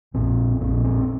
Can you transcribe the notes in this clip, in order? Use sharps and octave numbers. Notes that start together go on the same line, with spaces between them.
A#1 A#2 C4
A#1 A#2 C4
C4